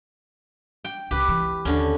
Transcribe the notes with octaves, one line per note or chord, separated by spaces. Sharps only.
G5
C2 G4 B4
E3
D#2 D3 C#4